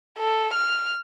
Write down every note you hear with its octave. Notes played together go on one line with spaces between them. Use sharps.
A4
F6